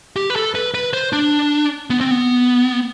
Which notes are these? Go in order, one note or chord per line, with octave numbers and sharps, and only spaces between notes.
G4
B4
A4
B4
B4
C5
D4
B3
C4
B3